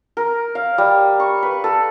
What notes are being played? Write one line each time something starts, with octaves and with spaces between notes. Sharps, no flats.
A#4
F5
G3
C#6
B4
A4